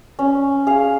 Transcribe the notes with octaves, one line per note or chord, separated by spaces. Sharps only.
C#4
G#4 F5